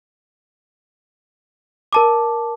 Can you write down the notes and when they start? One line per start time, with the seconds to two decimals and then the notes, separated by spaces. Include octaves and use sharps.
1.93 A#4 A5 D6